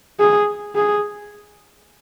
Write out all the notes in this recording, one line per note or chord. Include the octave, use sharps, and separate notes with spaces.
G#4
G#4